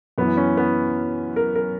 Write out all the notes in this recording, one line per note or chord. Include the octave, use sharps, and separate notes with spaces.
F#2 E3 B3
C#4
B3
A#4
A#4